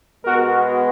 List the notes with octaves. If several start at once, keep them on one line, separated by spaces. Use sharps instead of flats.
B2 G#3 B3 F#4 A#4